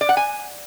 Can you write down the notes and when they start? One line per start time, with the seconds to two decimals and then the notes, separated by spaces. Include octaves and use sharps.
0.01 D5
0.09 F#5
0.17 G#5